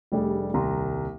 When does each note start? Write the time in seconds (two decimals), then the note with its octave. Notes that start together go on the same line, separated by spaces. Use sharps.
0.12 F1 G3 A3 D4 G#4
0.54 D#1 C2 A#5 C6